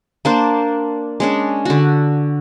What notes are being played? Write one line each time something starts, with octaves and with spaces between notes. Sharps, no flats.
A#3 D4 C5
G#3 C#4 D4
D3 F#4